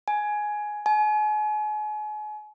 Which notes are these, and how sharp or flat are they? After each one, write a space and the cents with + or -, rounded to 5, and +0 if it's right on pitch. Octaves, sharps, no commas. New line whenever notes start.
G#5 +10
G#5 +35